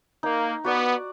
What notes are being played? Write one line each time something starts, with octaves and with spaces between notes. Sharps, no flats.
A#3 D#4
B3 F#4 D5